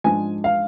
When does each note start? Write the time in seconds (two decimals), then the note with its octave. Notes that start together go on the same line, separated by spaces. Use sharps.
0.04 G#2 F3 G#3 D4 G#5
0.44 F5